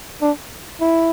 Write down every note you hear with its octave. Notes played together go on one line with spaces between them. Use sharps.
D4
E4